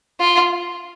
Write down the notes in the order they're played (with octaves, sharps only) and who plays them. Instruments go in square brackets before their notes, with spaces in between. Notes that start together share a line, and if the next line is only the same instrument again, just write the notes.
[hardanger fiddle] F4